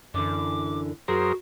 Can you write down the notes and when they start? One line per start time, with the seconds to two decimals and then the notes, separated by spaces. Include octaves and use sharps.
0.14 F#2 D3 E3 D4 D6
1.08 F#2 F#4 G#4 A#4 C5